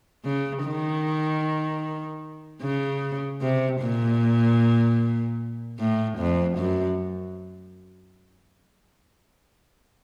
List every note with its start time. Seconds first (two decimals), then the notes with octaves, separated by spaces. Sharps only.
0.25 C#3
0.64 D#3
2.62 C#3
3.41 C3
3.81 A#2
5.79 A2
6.18 F2
6.58 F#2